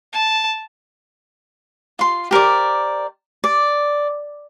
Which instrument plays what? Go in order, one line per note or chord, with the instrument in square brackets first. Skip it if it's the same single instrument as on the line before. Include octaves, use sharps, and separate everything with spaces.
[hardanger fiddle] A5
[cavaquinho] F4 C6
G4 A#4 C5 D5
D5